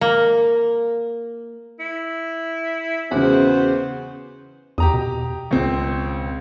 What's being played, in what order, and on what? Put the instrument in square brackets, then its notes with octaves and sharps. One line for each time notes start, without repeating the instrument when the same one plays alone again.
[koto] A#3
[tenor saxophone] E4
[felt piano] E2 C#3 [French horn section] B3 C5 [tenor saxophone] F#4
[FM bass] E2 [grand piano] G4 A#5 D#6
[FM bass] B2
[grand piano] C#2 C#3 C4